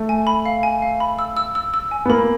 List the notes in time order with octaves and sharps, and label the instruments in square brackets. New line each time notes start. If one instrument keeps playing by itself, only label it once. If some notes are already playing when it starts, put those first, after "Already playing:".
Already playing: [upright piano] A3
[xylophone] G#5
B5
F5
G#5
F5
B5
E6
E6
E6
E6
G#5
[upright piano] B3
[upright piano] A#3 [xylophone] B5